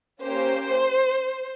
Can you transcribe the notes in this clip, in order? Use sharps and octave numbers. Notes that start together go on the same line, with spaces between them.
A#3 C#4 G4 C5